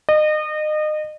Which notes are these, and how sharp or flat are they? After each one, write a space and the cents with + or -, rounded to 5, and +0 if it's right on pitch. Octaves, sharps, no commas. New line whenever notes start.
D#5 -30